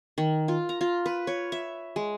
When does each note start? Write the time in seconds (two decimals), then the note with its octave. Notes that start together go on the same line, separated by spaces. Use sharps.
0.18 D#3
0.48 F4
0.69 A#5
0.81 F4
1.06 B4
1.27 C#5
1.52 E5
1.96 G#3